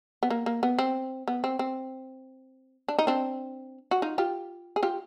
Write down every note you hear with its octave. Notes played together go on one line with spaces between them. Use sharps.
B3
A#3
A#3
B3
C4
B3
C4
C4
D4
D#4
C4 D4
F#4
D#4 F4
F4 G4
G#4
F4 G4